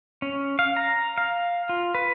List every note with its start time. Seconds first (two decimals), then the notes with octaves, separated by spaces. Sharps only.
0.22 C#4
0.59 F5
0.76 A#5
1.18 F5
1.69 F4
1.95 B4